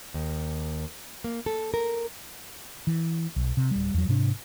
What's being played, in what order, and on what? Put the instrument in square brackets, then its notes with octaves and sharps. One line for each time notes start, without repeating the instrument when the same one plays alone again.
[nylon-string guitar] D#2
A#3
A4
A#4
[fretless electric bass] E3
B1
C3
D1 G3
E2 F#3
G#2 C3 C#4 D4